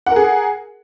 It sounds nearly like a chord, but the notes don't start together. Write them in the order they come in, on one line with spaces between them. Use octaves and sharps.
F#5 A#4 G#4